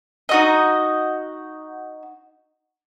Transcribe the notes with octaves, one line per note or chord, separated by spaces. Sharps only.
D#4 F#4 D#5